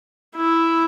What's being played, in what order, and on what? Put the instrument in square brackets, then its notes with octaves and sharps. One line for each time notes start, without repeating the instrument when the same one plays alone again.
[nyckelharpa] E4